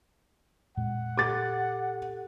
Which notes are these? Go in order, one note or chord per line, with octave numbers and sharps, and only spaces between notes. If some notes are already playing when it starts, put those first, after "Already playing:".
F2 A#2 G#3 F#5
G4 A4 D6 A6